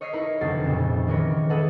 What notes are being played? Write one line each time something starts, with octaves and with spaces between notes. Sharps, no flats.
C#5 D#5 F6 B6 C7
D#4 E4 A#4 B4
F1 D2 E3 F#3 A6 C7
F2 A#2 C#3
D#3 E3 G#3 A#4 B4 C#5
G#4 A4 B4 D#5 E5 F#5